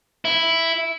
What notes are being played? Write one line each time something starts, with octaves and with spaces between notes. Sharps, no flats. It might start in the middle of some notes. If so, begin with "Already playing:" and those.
E4